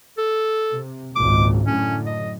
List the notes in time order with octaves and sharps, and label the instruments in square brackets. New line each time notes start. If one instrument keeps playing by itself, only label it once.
[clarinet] A4
[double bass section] C3
[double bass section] G#1 C#2 A#2 [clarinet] D6
[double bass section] F#2 A2 D3 [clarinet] C#4
[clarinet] D#5